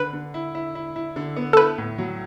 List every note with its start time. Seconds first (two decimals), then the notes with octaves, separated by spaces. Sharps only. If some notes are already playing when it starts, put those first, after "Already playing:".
Already playing: D3 B4
0.13 D3
0.34 E4
0.55 E4
0.75 E4
0.96 E4
1.16 D3
1.36 B3
1.53 A4
1.57 E4 B4
1.78 A2
1.98 F#3